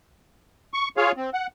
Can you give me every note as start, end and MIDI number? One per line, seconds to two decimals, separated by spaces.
0.73 0.89 85
0.97 1.12 65
0.97 1.12 68
0.97 1.12 73
0.97 1.12 77
1.17 1.30 60
1.34 1.47 78